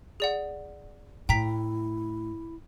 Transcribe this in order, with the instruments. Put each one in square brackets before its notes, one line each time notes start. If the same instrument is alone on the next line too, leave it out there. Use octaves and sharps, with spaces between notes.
[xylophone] G#4 D5 F#5
[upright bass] A2 [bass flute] E4 [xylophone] G5 A#5 B6